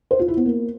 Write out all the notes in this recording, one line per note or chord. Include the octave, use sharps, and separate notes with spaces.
C5
F4
E4
B3
A#3